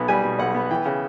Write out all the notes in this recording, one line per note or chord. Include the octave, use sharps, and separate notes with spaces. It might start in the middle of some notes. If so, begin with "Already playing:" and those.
Already playing: B1 B2 B3
G3 G#5
B2
B1 F#5
B3
E3 G5
C#3